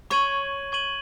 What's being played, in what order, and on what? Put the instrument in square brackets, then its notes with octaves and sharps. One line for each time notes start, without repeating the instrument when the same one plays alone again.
[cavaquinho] C#5 [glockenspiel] C#6 G#6 D#7 F#7
[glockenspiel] C#6 G#6 D#7 F#7